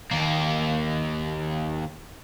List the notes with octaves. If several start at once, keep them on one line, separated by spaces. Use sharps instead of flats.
D#2 A#3